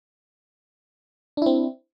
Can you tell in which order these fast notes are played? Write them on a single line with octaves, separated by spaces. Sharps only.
D4 E4 C4